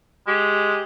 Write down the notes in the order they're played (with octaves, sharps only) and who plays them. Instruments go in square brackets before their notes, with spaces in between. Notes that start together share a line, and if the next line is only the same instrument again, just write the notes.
[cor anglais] G#3 [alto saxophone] G4